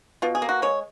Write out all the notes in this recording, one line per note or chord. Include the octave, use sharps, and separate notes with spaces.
B2 F4
G#4
A#3
F#4
G#3 C#5